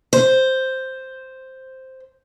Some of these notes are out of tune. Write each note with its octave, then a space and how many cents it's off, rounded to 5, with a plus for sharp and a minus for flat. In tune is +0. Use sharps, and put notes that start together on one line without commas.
C5 +0